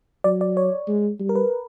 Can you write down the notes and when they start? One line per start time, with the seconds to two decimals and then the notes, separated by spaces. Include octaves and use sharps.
0.24 F#3 D5
0.41 D5
0.57 C#5
0.88 G#3
1.20 G3
1.29 A#4
1.35 B4